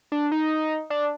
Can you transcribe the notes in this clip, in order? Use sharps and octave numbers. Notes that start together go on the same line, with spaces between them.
D4
D#4
D4